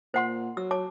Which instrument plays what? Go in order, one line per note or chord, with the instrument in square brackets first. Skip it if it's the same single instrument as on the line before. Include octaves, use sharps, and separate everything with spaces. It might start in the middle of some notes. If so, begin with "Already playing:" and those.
[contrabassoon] A#2 [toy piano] C5 F#5 C6
[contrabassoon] F#3 [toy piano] E6
[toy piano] C#5 A5 D6